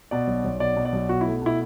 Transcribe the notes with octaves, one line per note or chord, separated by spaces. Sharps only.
B2 D5
B1
B1
B2 D5
B2
D5
B1
B2 F#4
A3 E4
B2 E4